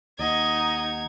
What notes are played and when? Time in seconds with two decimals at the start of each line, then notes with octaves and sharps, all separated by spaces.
0.19 D#2 D#4 D#5 F#5 A#5 G#6